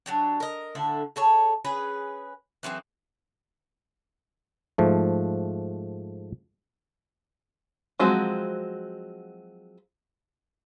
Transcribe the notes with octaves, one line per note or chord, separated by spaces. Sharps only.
F#3 D4 G4
A#4 D#5
A2 D3 E5
G#4 A4 C#5
C#4 G#4 B4
E3 F#3 C4 G#4
G#2 F3 A3
F3 F#3 G#3 C4 F#4